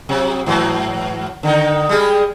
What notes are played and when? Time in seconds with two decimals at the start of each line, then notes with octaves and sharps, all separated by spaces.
0.09 C3 F#3
0.46 G#2 E3 F#3
1.43 D3 D#3 D#4
1.89 G3 G#3 G#4